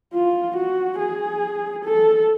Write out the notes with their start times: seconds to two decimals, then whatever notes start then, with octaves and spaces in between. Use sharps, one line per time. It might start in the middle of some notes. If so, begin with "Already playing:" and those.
0.14 F4
0.57 F#4
1.00 G#4
1.85 A4